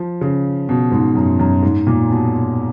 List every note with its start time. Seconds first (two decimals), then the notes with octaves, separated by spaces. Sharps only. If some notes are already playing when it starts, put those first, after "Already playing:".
Already playing: F3
0.21 C#3
0.69 B2
0.92 G#2
1.15 F#2
1.39 F#2
1.63 G#2
1.87 A#2
2.10 B2